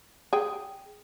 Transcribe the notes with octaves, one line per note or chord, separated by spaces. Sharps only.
G#4 G5